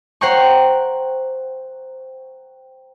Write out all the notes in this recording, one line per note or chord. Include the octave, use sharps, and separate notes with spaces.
C5 F#5 G5 A#5 C#6